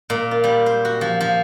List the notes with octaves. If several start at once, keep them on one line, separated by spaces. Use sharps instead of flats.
A#2
F4
G3
C5
F#4
F3
F3